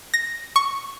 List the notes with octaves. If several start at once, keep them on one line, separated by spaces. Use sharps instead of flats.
A#6
C#6